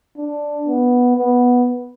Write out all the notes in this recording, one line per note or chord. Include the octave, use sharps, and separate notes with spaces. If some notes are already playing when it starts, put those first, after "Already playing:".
D4
B3
B3